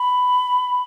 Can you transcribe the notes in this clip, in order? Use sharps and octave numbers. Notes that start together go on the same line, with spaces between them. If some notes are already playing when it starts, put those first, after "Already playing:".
Already playing: B5